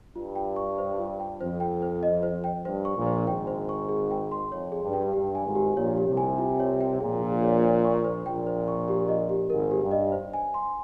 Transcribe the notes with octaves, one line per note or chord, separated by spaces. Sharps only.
G2 F4
G5
C#6
C5
F4
G5
F2 C5
G5
C5
D#5
C5
G5
G2 C5
C#6
A#1 A#2
C5
G#1 G#2 G5
C5
C#6
G#4
G5
C6
F2 C#5
G#4
G2
G5
G2 G4
G#5
G#1 G#2
G4
A#1 A#2 C#5
G4
C2 C3
G#5
F4
C#5
G5
A#1 A#2 G#4
F4
C#5
C5
C#6
C5
A#1 A#2 G5
C5
C#6
G4
D#5
G4
G#1 G#2 A#4
G4
G2
D#5
C5
G#5
C6